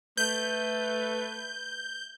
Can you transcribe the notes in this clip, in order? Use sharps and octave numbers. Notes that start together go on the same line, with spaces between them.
A3 B4 G6